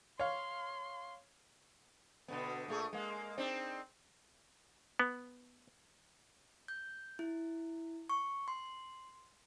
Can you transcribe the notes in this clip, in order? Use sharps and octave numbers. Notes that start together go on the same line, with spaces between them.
C#5 F5 C6
B2 D3 B3
A#2 A3 G#4
G#3 A#3
C4 D4 D#4
B3
G6
E4
C#6
C6